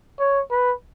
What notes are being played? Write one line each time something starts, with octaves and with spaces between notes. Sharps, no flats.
C#5
B4